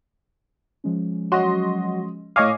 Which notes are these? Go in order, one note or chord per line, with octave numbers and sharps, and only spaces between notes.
F3 G#3 C#4
F#3 F#4 D#5 C6
A2 C#5 D#5 F5 G#5 D6